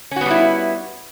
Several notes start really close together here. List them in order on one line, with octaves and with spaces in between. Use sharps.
C#4 F#4 B3 G3 E4